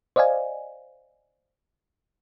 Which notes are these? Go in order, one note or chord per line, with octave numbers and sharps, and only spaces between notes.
C5 D5 D#5 F5 G#5